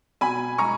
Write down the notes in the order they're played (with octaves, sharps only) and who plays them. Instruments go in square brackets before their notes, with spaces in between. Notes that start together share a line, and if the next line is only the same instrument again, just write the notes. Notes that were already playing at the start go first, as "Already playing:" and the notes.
[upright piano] B2 G#5 B5
G#3 A#5 C#6